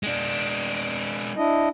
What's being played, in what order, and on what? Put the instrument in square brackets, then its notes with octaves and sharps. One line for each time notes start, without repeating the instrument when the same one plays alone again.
[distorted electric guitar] G#3 D4
[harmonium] D4 E4 D#5